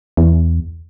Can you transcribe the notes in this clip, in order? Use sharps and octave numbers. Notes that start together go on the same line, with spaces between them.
E2